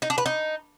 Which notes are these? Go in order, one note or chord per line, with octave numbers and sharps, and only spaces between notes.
D#4
D4
B4
D#4